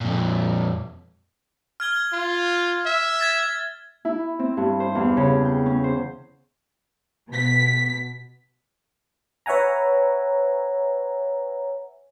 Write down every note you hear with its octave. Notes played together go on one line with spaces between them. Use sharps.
F2 A#2
F6 G#6 G7
F4
E5
G#6 A6
E4
C4
G2
C5
E2
C#3
G5
C#4
C5
B2 B6
B4 C#5 E5 F#5 G#5 A#5